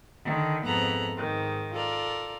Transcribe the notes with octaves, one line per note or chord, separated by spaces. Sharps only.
D3 D#3
F2 G#2 B3 A4 A#5 F#6
G#2 D#3
F4 A4 A#4 D5